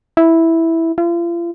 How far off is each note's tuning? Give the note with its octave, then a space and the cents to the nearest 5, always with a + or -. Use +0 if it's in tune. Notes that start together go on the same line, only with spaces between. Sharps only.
E4 -5
F4 -40